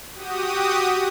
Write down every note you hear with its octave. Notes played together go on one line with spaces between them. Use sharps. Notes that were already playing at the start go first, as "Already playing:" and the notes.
F#4 G4 D#6